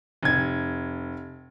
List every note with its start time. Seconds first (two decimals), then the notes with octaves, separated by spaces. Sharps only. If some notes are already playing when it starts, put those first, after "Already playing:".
0.23 F1 G#6